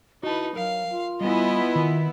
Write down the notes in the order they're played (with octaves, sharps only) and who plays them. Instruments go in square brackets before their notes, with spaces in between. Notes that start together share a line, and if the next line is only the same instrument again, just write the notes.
[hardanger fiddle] D#4 B4 [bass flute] E4 [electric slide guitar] F#4 A5
[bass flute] F#3 [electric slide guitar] A#4 [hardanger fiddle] F5
[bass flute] F4
[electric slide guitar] G3 [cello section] B3 E4 [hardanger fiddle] D#5 G#5
[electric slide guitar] D#3